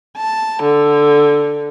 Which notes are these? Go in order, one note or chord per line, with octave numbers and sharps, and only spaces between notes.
A5
D3